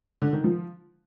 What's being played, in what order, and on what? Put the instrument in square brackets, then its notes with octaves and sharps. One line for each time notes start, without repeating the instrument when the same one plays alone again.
[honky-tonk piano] D3
D#3
F3